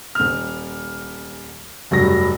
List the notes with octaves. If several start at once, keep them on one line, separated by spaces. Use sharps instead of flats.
D#1 F6
F1 G2 F#3 A#6